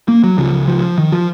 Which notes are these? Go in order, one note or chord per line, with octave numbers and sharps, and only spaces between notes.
A#3
F#3
C#2 C#3 F3
F3
D#3
F3